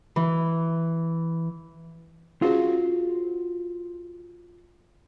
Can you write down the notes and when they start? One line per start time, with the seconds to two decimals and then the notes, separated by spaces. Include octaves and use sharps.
0.16 E3
2.42 C#4 F4 F#4 G#4 C5